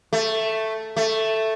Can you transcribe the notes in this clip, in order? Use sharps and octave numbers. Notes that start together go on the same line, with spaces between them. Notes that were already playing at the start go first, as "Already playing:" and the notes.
A3
A3